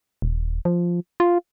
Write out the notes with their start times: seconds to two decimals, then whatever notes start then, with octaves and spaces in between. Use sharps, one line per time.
0.22 D#1
0.65 F3
1.20 F4